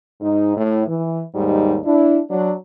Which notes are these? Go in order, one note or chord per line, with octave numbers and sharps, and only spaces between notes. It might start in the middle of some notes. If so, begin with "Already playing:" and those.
G#2 D#4
A2
E3
D#2 G#2 G3 D#4
D4 E4
F#3 D4